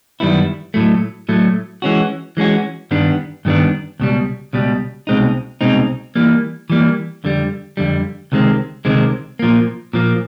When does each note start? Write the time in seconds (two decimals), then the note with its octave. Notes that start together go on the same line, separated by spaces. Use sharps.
0.20 F#2 D#3 G3 B3 E4
0.74 A2 F#3 A3
1.29 A2 F#3 A3
1.82 E3 G#3 C#4 F#4
2.37 E3 G#3 C#4 F#4
2.91 G2 D#3 G3 B3 D4
3.45 G2 D#3 G3 B3 D4
4.00 C#2 B2 G3
4.53 C#2 B2 G3
5.07 C2 B2 G#3 C4 D#4
5.61 C2 B2 G#3 C4 D#4
6.16 E3 G3 A#3
6.70 E3 G3 A#3
7.24 F2 D3 G3
7.77 F2 D3 G3
8.32 C#2 C3 D#3 G#3 C4
8.85 C#2 C3 D#3 G#3 C4
9.39 A#2 F3 A#3
9.93 A#2 F3 A#3